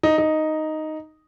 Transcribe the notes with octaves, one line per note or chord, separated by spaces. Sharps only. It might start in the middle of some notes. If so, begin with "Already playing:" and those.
D#4
D#4